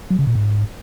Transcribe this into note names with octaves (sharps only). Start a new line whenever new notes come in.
F#3
C#3
A#2
G#2